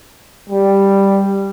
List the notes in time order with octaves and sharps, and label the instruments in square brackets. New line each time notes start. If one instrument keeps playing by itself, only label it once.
[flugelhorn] G3